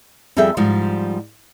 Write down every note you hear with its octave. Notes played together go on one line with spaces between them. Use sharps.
F2 G3 G#4 A4 E5 G5
G#2 F3 G3